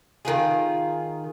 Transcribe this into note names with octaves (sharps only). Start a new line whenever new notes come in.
D#3 F4 G#4